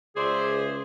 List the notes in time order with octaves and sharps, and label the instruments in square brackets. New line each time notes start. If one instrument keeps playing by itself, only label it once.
[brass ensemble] C#2 [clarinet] G#4 [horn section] C5 D5 E5